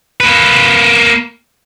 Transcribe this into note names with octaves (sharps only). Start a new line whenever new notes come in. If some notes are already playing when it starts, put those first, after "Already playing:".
A#3 B4